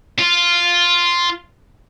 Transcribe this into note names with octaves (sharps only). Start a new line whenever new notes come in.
F4